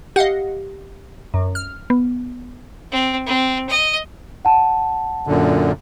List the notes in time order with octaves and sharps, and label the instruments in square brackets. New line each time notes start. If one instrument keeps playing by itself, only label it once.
[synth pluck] G4 [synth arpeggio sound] D#5 F5 F#5
[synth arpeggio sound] F#2
F6
[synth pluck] B3
[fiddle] C4
C4
D#5
[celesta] F#5 A5
[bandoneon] F#2 A#2 D3